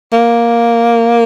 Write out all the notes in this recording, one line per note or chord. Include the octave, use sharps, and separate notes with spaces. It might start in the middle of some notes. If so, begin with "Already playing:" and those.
A#3